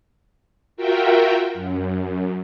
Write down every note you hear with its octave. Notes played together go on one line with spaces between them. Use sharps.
F4 F#4 A#4 E5 G5
F#2